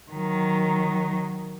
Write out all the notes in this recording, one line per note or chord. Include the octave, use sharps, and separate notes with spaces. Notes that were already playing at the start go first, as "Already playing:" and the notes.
D#3 F#3